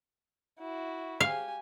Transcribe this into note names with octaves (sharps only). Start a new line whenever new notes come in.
E4 F#4
G4 F5 G#5